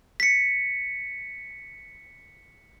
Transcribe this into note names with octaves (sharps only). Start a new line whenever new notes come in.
B6 C#7